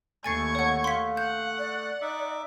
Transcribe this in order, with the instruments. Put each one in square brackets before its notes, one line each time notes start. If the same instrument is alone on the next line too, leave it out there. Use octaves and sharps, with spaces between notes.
[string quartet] D#2 C#6 G#6 [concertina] A3 [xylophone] G#5 A6 C7 [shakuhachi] A5
[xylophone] C#5 F#5
[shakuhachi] F5 [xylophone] C6 B6
[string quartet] F#5 [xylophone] G6
[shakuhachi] D5
[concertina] D#4 E5 D6